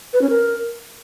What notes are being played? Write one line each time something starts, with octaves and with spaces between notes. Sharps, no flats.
B4
C#4
A#4